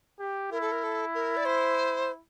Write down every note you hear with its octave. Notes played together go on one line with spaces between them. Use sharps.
G4
E4 A#4
A4
A#4
A4
A#4
D5
C5